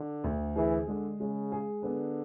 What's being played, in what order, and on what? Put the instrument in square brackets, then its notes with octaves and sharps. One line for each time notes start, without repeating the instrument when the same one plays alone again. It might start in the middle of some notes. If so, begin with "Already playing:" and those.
Already playing: [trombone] D3
[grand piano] D2
[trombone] E3 [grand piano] G#4
[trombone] D3 [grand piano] G#3
[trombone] C#3 [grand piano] G#3
[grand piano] G#4
[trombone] D3 [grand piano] B3